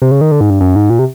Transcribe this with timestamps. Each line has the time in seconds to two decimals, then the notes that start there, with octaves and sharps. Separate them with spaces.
0.02 C3
0.11 C#3
0.21 D#3
0.32 D3
0.41 G#2
0.50 G2
0.61 F#2
0.76 G#2
0.90 A#2
0.99 C3